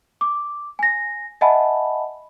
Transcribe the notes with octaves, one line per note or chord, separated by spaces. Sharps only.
D6
G#5 A#6
D#5 E5 F#5 G#5 A5 B5